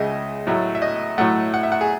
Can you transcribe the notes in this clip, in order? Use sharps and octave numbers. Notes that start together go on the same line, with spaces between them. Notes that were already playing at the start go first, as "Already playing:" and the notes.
Already playing: C#2 C#3 G#3 D#5 E5
A2 F#3 A3
E5
D#5
A2 F#3 A3 F#5
F#5
E5
F#5
G#4